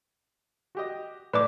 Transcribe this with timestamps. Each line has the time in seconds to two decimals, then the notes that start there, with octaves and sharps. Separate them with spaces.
0.75 F#4 G4 D#5
1.33 A2 B4 D5 D6